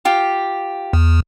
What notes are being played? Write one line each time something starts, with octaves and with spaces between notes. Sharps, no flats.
F4 G4
E2